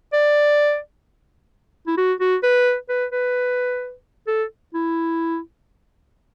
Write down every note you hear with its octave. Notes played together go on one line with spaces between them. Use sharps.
D5
E4
F#4
F#4
B4
B4
B4
A4
E4